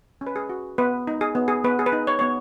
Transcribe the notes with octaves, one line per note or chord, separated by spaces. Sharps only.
C#4
B4
G#4
F#4
B3 B4
D#4
G#4
B3
G#4
B3 B4
G#4
B4
D#4
C#5
B3 C#5